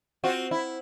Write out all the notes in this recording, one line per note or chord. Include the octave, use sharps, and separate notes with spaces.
C4 F4 F#4
E4